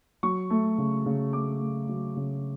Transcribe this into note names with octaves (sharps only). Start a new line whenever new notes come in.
F#3 C#6
A3
C#3
C#3
A3 D6
A3
F#3
C#3